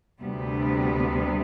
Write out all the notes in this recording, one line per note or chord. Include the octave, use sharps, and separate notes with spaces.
D2 C3 G3 B3